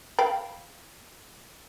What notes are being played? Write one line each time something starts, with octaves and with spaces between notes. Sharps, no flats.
F5 G5 B5